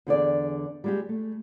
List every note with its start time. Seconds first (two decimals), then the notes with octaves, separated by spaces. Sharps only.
0.07 E2 D3 G#4 D5
0.84 G3 G#3 G4
1.09 A3